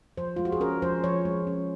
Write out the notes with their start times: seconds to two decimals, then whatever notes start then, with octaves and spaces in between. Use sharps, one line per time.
0.17 F3 C5
0.36 G#3 F4
0.45 F#4
0.52 G#4
0.60 C#4 A#4
0.82 F3 C5
1.04 F3 C#5
1.25 G#3
1.47 C#4